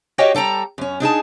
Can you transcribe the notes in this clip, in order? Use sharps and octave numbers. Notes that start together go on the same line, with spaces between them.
F#4 G4 C#5 D#5 F5 G5
G3 A4 G5 A#5
F#2 C#4
D4 D#4 G#4 A5